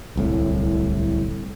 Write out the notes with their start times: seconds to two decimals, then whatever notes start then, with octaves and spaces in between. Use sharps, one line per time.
0.16 D1 C2 A2